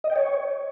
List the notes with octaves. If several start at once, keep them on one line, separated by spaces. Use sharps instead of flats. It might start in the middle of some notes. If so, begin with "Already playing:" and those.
D#5
G5
C#5